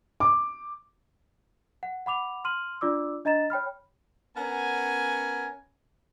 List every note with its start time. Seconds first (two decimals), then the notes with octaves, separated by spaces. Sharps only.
0.20 D6
1.83 F#5
2.06 F#5 B5 D6 F7
2.45 C6 F6 D#7 F#7
2.81 D4 F4 D5 D6 E6
3.25 D4 D#5 A#5 A6 E7
3.50 C#5 G5 B5 F6
4.36 B3 C#4 A#4 F#5 G#5